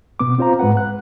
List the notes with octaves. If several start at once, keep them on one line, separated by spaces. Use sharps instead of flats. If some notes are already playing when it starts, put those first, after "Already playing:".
B2 B3 D6
C4 F4 C5 F5 A#5
G#2 G#3 B4 F#5
F#6